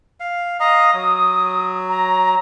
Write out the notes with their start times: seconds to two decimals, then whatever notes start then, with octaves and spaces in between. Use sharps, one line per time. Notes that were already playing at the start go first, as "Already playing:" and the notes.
0.20 F5
0.60 D#5 F5 A#5 D#6
0.94 F#3
1.89 A#5